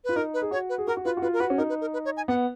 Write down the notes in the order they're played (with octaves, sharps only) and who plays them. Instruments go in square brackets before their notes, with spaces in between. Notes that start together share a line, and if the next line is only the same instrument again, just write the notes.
[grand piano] F4 [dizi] B4
[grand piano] D#4 [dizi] A#4
[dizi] B4
[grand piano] G#4
[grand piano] F#4 [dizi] C#5
[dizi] B4
[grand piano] G#4
[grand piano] F#4 [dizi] A#4
[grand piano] F#4
[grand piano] F4 [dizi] B4
[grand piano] F#4
[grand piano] F4 [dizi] B4
[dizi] A#4
[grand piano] F#4 [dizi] B4
[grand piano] C#4
[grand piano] D#4 [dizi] A#4
[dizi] B4
A#4
B4
C#5
G#5
[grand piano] B3 [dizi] F#5